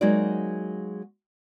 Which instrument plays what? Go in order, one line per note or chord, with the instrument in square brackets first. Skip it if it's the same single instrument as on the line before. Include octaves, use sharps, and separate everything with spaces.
[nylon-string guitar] F#3 G#3 A#3 D#4 F#4 D5